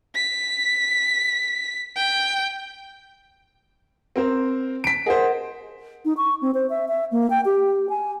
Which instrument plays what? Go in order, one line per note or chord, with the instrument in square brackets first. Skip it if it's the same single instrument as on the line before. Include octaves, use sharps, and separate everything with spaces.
[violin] B6
G5
[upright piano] C4 A#4 C5
B6 D7
[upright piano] G#4 C5 [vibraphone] A#4 D#5 F#5
[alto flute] D#4
C#6
C4
C5
E5
E5
A#3
G5
G4
G#5